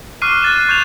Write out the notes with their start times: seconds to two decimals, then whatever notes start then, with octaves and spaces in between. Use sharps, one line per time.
0.22 C#6 D6 F6 F#6 C7 D#7
0.42 F#6 A6 E7
0.69 C#6 G6 G#6 E7 F7